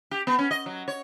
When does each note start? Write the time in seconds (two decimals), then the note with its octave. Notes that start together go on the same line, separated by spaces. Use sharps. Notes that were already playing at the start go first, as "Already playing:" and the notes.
0.11 G4
0.27 B3
0.39 C#4
0.51 D#5
0.66 F#3
0.88 C#5